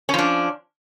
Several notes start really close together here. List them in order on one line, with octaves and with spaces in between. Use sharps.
C#4 F3 D4